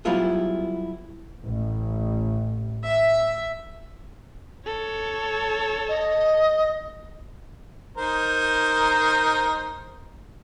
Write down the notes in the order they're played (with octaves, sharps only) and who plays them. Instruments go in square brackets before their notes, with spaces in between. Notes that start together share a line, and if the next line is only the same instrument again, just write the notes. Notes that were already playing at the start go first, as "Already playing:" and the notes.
[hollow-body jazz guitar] F#3 G3 B3 E4 F4 G#4
[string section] A1
E5
[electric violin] A4 C#5
[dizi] D#5
[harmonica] D#4 A#4 C5